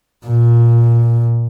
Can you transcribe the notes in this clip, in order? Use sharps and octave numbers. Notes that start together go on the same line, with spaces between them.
A#2